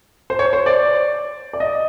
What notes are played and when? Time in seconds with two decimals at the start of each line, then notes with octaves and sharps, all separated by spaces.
0.30 C5
0.39 C#5
0.53 C5
0.66 D5
1.53 D5
1.60 D#5